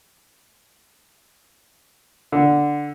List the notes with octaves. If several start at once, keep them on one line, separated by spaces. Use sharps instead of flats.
D3